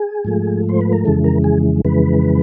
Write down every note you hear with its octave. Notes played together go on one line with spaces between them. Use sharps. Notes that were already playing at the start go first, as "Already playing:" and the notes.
Already playing: G#4
G#2 F3 A3
C5
B4
A#4
F2 C#3 E3 G#3 A4
A#4
G#4
F2 C#3 E3 G#3 B4